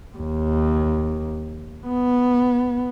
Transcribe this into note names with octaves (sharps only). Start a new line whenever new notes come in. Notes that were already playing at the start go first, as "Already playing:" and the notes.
D#2
B3